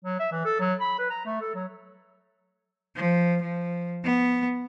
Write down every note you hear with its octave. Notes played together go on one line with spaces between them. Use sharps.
F#3
E5
E3
A4
F#3
B5
B4
A#5
A3
A4
F#3
F3
F3
B3